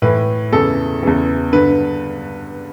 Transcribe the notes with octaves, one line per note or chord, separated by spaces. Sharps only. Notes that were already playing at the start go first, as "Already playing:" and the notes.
A2 E3 B4
E2 C#3 E3 A4
E2 C#3 E3
G2 D3 B4